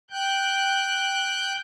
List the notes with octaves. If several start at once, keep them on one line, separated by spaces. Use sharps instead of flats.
G5 F#6 G6